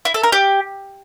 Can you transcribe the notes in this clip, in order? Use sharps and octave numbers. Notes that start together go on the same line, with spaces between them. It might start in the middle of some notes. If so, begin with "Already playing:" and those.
E4
A4
A#4
G4